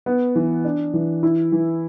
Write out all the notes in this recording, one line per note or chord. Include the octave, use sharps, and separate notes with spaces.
B3
E3
D4
E3
E4
E3